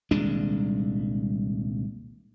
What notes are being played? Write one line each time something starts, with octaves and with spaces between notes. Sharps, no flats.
D#1 C2 G#3 D4